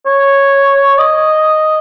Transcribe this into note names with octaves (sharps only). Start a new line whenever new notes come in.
C#5
D#5